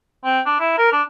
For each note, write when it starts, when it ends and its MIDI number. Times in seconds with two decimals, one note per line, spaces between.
0.24 0.40 60
0.46 0.57 62
0.59 0.76 64
0.78 0.92 70
0.92 1.02 62